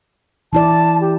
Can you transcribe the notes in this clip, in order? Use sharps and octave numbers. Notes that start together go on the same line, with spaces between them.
E3 E4 D5 A5
G4